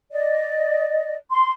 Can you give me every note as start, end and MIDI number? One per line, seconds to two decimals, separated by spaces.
0.12 1.15 74
0.12 1.15 75
1.31 1.51 84